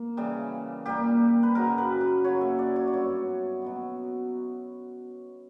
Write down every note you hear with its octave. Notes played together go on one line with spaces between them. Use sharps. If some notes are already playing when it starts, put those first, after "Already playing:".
Already playing: A#3
C#3 E3 G3
A#2 G3 A#3 G4
B4
F#2 C#3 F#3 A#4
B4
B4
C#3 F#3 A#3 C#5
E5
D5
C#5
D5
G2 F#3 B3 C#5
B2 F#3 B3